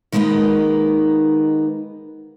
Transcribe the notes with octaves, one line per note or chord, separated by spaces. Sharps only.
D#3 G#3 A#3 B3 D#4 B4